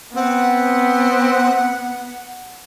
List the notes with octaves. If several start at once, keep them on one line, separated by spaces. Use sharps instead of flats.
B3 C4 F#5